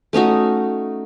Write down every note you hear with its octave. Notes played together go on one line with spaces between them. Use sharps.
A3 C#4 D#4 F#4